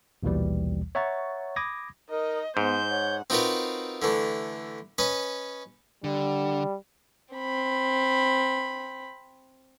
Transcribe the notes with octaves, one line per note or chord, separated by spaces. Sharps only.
A#1 D#2 B2 E3 G3
C#5 E5 F#5 A#5 C#6 A6
B5 D6 D#6 G#6 A#6
D#4 A#4 D#5
G#2 B3 C5 G6
C#5 F#5
C4 D#4 F4 F#4 A#4 B4
D3 E3 A3
C#4 B4 D#5
D3 G3
C4 B5